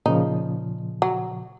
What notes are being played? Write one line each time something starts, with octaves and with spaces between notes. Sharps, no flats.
A#2 C#3 F3 D#4
F#3